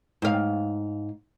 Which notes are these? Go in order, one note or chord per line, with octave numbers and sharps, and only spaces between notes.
G#2 F5